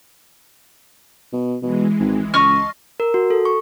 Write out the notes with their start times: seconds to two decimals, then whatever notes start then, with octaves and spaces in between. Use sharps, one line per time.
1.33 B2
1.62 B2 E3 G#3
2.00 G#1
2.34 C#2 D#5 A5 C6 C#6 F6
3.00 A#4
3.14 F#4
3.30 A4
3.45 C#6